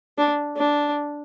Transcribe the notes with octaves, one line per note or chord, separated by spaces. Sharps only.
D4
D4